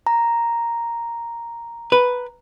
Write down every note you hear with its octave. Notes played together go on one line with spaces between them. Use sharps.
A#5
B4